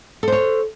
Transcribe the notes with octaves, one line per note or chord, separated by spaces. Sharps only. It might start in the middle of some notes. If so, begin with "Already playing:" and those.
A4 C5 C#5